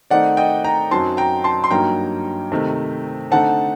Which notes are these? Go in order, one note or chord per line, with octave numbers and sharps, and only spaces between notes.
D#3 A3 C4 D#4 D5 F#5
D#5 G5
G5 A#5
F#2 F#3 C4 D#4 A5 C6
G5 A#5
A5 C6
C6
G2 F#3 A#3 D#4 G5 A#5
C3 D#3 A3
D3 A3 C4 D#4 F#5 A5